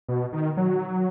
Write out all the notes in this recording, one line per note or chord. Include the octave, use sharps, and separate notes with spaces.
B2
D#3
F#3